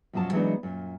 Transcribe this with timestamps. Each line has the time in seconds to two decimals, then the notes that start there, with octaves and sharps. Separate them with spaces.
0.13 F#2 B2 F3 F#3 A5
0.33 E3 F#3 G#3 B3 D4 D#4
0.63 F#2 A#2